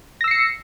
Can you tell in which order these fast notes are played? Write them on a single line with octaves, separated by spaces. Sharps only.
A#6 E6 C7 C#7